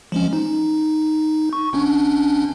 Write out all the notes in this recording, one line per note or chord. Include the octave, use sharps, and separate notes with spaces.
F3 G#3 C#4
D#4
C#6
G1 C#4 D4